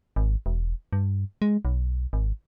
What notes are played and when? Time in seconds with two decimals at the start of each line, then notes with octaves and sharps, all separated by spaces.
0.16 G#1
0.46 E1
0.93 G2
1.42 G#3
1.65 B1
2.13 G#1